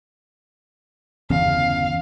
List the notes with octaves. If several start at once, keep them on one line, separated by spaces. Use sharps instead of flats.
G1 E2 C#3 F5